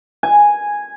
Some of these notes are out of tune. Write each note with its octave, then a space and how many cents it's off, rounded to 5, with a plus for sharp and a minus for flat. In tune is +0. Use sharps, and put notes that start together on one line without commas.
G#5 -5